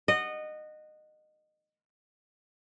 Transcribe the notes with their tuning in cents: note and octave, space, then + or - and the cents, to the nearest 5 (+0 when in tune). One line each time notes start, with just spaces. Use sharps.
D#5 -20 F#5 +0